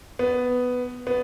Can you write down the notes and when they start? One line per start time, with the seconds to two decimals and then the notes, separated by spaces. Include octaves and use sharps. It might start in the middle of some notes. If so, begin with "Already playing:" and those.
0.19 B3
1.07 B3